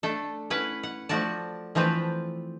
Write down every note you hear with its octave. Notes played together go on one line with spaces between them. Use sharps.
A3 D4 A4
C#4 E4 B4 F#5
F#5
F3 A3 F#4 D5 A5
E3 F3 A3 C4 B4